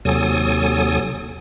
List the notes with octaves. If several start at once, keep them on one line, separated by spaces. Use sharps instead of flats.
D#2 C3 F#3 A4 G#5 D#6